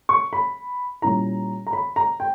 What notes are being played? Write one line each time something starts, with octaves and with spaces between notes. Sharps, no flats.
C#6
B5
A#2 G3 C#4 E4 A#5
A#5
B5
A#5
G5